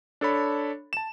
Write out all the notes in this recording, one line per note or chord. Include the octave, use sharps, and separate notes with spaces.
D4 A4 C#5 B5
A5 E7